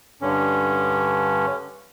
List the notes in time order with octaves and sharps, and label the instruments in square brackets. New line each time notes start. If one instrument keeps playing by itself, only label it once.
[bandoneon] G2 D3 C#4